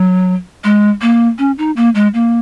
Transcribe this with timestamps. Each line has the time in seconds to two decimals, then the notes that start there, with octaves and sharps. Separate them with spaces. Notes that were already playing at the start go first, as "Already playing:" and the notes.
Already playing: F#3
0.64 G#3
1.01 A#3
1.38 C#4
1.58 D#4
1.76 A#3
1.95 G#3
2.14 A#3